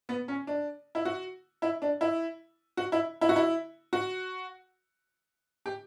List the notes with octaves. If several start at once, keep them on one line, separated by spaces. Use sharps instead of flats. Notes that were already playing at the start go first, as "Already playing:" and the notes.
B3
C#4
D4
E4
F#4
E4
D4
E4
F#4
E4
E4
F#4
E4
F#4
G4